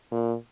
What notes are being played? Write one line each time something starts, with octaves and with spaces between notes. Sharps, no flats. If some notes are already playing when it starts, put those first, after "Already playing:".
A#2